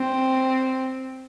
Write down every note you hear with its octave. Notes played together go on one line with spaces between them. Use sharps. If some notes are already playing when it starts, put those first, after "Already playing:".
Already playing: C4